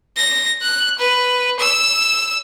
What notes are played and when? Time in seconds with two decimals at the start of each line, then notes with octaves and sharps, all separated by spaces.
0.16 A#6
0.62 F#6
0.99 B4
1.60 E6